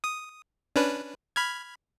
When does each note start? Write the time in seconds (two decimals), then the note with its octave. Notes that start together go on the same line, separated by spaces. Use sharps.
0.04 D#6
0.76 C#4 D4 B4
1.36 B5 F6 G#6